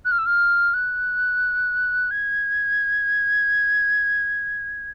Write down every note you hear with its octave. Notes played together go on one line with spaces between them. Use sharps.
F#6
F6
E6
F6
F#6
G#6